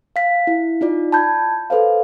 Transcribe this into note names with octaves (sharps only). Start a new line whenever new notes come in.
F5 B6
E4
D#4 F4 D5
A5 B5 G6 G#6
A4 B4 C5 F5